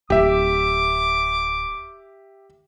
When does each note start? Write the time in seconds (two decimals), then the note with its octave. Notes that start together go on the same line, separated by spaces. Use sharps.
0.10 D1 G4 E5 D6